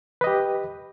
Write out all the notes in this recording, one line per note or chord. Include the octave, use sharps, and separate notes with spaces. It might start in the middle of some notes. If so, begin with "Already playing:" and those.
G4 B4 D#5